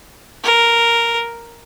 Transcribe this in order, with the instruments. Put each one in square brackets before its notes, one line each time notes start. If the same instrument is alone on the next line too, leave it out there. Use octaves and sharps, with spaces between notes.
[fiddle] A#4